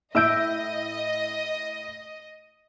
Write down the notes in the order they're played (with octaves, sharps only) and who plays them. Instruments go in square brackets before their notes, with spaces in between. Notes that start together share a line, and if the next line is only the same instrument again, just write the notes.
[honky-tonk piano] A2 E5 D7 [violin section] D#5 [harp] E6 G6